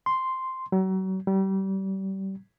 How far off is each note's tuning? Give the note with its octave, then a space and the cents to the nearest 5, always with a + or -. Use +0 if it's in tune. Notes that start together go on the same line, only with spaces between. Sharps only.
C6 -5
F#3 +35
G3 -30